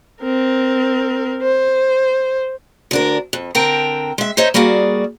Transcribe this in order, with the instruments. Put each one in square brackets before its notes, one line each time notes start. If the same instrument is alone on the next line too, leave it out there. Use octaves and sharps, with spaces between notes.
[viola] C4 A#4
C5
[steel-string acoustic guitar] D2 D4 A#4
F2
D3 C4 A#4 G5 A5 A#5
G#3 E5
D#4 C5 C#5 D#5 E5
G3 A#3 F#4 G#4 D5